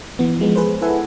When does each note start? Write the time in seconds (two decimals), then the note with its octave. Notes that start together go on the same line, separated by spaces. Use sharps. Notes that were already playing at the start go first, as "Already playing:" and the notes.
0.19 E3 B3
0.39 F3 G#3 B3
0.56 G#4 B4 C5
0.82 E4 A4 B4 E5 F#5 G#5